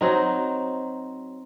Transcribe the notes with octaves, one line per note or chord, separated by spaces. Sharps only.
F#3 C4 D#4